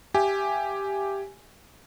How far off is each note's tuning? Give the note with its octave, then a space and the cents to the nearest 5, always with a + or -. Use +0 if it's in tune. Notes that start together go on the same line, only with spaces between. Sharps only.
G4 +0 E5 +25 G#5 +0